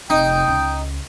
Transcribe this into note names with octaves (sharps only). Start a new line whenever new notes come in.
F1 D#4 G5
C#2